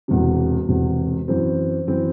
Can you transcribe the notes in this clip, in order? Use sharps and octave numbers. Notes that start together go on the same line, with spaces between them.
E1 E2 C3
E1 E2 C3
F#2 E3 C4
F#2 E3 C4